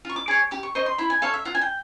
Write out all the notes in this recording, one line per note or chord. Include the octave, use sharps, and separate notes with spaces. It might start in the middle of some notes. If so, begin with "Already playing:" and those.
F4 C#6
D6
G#4 C#5 D6
G4 D6
C#6
C5 D#5 C#6
C6
E4 B5
G#5
A4 C#5 F5
E5
F4 F#5
G#5
G5